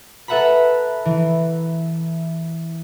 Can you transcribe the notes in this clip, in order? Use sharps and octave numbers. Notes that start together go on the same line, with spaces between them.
A4 B4 E5 F#5 A#5 B5
E3